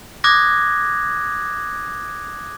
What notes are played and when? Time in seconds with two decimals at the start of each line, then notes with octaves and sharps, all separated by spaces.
0.24 D6 D#6 F#6 G#6 A#6